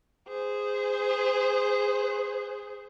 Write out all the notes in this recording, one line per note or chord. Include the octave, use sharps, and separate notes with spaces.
G#4 C5